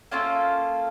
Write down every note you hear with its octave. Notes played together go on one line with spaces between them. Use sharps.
A#3 C#4 F4 A4